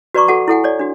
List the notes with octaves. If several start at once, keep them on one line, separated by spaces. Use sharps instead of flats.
F#4 B4 D5 A#5 C#6 D6
F#4 A4 F#5 A5
E4 A4 F#5 G#5
A4 C#5 D5
D4 F#4